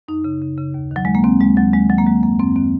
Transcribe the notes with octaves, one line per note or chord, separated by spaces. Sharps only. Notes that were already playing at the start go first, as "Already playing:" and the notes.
F#2 D#4
C#3
C#3
C#3
D#2
D#3 F#3
D#2 G#3
A#3
D#2 C4
D#2 G#3
D#2 F#3
D#3 G#3
D#3 F#3
A#3
D#3 G#3
F#2 A#3
F#2 C4
D#3 C4